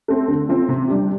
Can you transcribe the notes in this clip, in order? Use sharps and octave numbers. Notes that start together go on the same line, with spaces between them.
A3 C4
D3
F3 C4
C3
G3 D4 G4